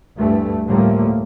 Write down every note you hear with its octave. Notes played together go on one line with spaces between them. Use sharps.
D2 G2 E3 A3
A2 D3 F3 G3 A3 A#3